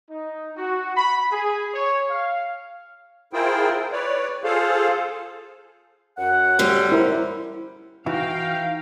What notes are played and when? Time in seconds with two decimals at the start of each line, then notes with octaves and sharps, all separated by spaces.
0.10 D#4
0.57 F#4
0.97 B5
1.32 G#4
1.74 C#5
2.11 F5
3.33 E4 F4 G#4 A#4 C5 G5
3.92 B4 C#5 D5
4.44 F4 G#4 A4 C5 F5
6.18 F#2 F#5
6.59 D3 G3 C#4
6.92 E4 A#4 C5
8.06 E3 D#4 E4 F#4 F5 G5